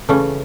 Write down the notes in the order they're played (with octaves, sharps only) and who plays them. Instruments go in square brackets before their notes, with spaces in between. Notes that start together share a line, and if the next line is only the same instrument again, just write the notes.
[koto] C#3 E3 A3 C#4